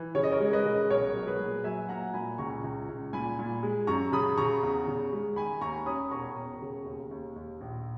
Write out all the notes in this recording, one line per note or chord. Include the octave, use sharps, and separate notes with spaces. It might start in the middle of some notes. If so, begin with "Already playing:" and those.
Already playing: E3
C#3 C#5
D#5
A#4 C#5
G#3
B4 D#5
C#3
B1 A#4 C#5
F#3
G#4 B4
A#2
F#3 E5 G#5
A#3 F#5 A#5
A#2 G#5 B5
C#2 A#5 C#6
C#2
C#2
A#2 G#5 B5
A#2
G#3
F#2 A#5 C#6
C#3 B5 D#6
C#3 A#5 C#6
E2
C#3
G#3
D#3 G#5 B5
D#2 A#5 C#6
C#4 B5 D#6
E1 A#5 C#6
E1
C#3
D#2
D#2
D#2
A#1